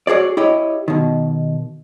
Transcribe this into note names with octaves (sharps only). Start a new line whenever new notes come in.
F#4 G#4 C#5 D5
E4 G4 C#5 D#5
B2 D#3